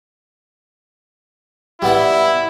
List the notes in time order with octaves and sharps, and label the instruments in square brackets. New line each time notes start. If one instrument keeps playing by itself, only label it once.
[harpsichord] G3 B3 D5 [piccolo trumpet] E4